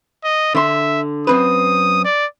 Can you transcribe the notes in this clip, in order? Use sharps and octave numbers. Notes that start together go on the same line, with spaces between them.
D#5
D3 E5 C6
F#2 C4 B4 D#6
D5